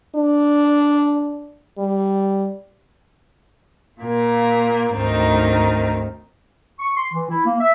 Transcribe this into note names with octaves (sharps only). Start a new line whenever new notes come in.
D4
G3
A#2 A#3
D2 G#2 D#3 C4 D#4
C#6
C6
E3
E4
A#3
E5